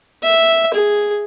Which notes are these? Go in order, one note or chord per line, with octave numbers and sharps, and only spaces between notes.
E5
G#4